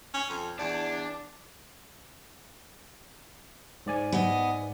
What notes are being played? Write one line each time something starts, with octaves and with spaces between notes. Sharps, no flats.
C#4
F2
E2 D4
G#2 D5 G#5
B3 D#5